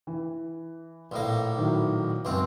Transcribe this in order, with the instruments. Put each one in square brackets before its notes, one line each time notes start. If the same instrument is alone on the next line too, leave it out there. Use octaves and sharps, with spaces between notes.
[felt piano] E3
[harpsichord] A#1 A2 A#3
[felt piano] D#3 F#3 E4
[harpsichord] C#2 F#2 C4